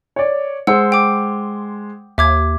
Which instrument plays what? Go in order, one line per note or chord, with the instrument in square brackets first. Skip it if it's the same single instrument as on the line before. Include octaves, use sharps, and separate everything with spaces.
[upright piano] C#5 D5
[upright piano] G#3 C5 [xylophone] F#5 E6
[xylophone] G5 D6
[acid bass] D#2 [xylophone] E5 D6 G#6